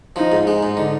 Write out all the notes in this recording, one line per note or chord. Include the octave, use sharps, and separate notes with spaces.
F3 D#4
G#2
G#3 D#4
G#2
D3